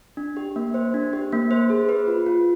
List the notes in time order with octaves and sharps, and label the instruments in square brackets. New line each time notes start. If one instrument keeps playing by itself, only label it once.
[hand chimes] D4
G4
A#3
C5
D4
G4
A#3
C5
G#4
B4
F4
F4